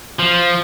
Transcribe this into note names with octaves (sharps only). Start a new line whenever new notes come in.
F3